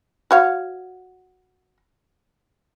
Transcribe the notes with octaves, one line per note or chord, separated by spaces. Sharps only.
F#4 C#5 F5